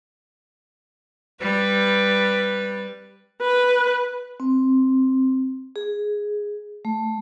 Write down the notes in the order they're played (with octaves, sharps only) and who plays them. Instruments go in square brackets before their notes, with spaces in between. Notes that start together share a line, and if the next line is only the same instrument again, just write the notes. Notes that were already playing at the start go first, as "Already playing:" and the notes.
[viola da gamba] G3 [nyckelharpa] B4
[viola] B4
[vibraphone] C4
G#4
A3